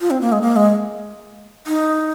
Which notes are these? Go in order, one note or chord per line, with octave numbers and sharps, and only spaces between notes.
F4
C4
A#3
G#3
A#3
G#3
D#4